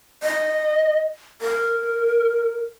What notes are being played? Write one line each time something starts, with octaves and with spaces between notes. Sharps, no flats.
D#5
A#4